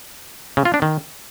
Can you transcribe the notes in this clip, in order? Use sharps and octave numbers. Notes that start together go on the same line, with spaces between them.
C#3
F4
D4
D#3